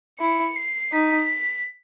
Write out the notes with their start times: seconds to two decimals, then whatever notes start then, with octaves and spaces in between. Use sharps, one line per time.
0.20 E4 C#7
0.55 C7
0.92 D#4 B6